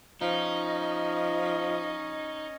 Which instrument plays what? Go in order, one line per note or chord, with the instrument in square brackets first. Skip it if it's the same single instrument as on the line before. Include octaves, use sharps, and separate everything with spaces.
[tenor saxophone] F3 [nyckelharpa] C#4 D#5 [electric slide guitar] D#4